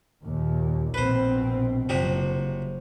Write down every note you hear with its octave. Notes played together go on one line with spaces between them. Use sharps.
D#2 A#2
A#1 B2 C4 B4 C5
F#1 C3 F3 F#3